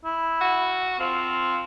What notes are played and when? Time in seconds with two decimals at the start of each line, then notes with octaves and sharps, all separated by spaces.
0.05 E4
0.41 F#4
0.99 F3 C4